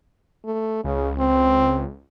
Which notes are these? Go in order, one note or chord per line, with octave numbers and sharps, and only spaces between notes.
A3
C#2 C#3
C4